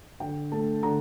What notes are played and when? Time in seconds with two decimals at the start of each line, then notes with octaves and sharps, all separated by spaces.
0.20 D3 G5
0.52 A3 A5
0.83 D3 A#5